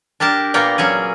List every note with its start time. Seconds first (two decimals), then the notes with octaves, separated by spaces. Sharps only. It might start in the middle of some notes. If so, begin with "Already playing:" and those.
0.20 D4 G4 A#4 A5
0.54 A#2 A#3 B3 A#4 F5 G5
0.78 F#3 C#4 G#4